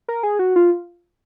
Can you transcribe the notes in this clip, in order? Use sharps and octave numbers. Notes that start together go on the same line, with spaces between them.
A#4
G#4
F#4
F4